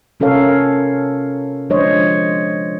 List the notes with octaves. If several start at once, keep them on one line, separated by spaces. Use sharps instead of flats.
C3 C#4 A4 A#4 C#5 F5
F3 G#3 D4 C5 C#5 D#5